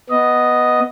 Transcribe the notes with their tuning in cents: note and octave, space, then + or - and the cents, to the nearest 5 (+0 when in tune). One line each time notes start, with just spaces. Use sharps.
B3 +0 D#5 +0